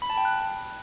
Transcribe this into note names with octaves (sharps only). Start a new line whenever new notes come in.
B5
A5
G5
F#6